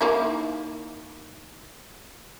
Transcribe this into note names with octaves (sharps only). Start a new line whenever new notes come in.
D#3 A#3 E4